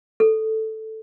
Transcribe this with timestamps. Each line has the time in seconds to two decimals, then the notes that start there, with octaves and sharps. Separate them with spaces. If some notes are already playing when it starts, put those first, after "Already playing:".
0.20 A4